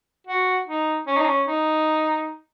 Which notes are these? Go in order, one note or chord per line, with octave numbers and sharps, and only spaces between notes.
F#4
D#4
C#4
D#4
C#4
D#4